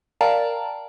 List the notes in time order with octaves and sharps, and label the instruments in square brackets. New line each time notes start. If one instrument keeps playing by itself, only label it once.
[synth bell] A#4 D5 F5 G5 A5 A#5